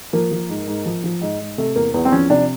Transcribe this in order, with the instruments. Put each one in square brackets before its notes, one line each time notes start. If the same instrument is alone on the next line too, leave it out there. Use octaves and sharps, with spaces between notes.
[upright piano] F3 A#3
F3
G#2
G#2
F3
F3
G#2
G#2
C3 A3
E2 A#3
E2 B3
C4
F3 C#4
C3 D4